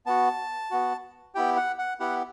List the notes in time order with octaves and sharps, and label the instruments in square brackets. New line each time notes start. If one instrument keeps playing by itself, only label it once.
[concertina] B3 F#4 A5
B3 F#4
B3 E4 G4 G5
F#5
F#5
B3 E4 G4 F#5